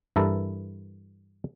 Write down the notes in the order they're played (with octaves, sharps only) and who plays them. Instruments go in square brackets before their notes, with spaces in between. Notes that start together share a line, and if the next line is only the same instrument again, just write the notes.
[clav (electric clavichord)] G2 E3 E4 A4 A#4 A5